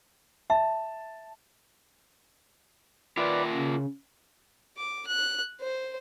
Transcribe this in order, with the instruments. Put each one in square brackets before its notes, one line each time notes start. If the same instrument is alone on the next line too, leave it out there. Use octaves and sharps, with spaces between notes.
[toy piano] E5 [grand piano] A5
[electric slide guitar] F4 A#4 E5 [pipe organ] B4 D5
[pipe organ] C#3
[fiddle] D6
F#6
C5